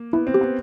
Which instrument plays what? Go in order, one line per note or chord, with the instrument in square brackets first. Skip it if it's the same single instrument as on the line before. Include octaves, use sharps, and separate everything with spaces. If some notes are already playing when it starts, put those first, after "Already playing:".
Already playing: [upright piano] A#3
[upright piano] B3 [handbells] E4
[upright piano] C4
[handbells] G4
[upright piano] B3